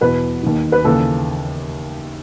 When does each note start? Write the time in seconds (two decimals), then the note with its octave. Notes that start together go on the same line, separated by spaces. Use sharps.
0.01 E2 B2 B4
0.43 D#2 D#3
0.72 B4
0.84 D#2 C#3 E3 A4